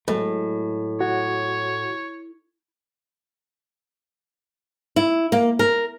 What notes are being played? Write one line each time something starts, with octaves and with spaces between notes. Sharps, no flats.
A2 F#3 G#3 A3
F#4 C#5
E4
A#3
A#4